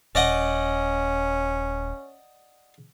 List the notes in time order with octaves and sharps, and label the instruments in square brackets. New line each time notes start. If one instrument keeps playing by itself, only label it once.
[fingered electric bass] D#1 [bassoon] C#4 [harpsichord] D5 D#5 F#5